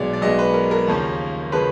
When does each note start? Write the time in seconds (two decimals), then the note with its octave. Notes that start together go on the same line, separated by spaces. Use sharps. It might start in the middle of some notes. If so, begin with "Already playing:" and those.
Already playing: B1 B2 G#3 C#5 D5
0.13 D5
0.21 B1 B2 G#3 D#5
0.39 B4
0.54 A#4
0.71 A#4
0.86 D#2 C#3 F3 A#3 C#4
1.52 C#3 F3 A#3 C#4 B4